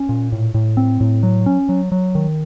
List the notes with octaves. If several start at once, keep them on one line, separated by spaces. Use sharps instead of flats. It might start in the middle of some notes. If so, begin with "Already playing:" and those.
Already playing: C#4
A#2
A2
A2
C4
A2
F#3
C#4
F#3
F#3
D#3